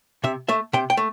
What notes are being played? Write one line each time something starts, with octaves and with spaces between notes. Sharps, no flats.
C3 E5
A3 E5
C3 G5
G5
A3